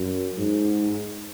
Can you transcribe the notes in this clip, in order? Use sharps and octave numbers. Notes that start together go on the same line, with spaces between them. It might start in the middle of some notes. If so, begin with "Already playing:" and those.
Already playing: F#2
G#2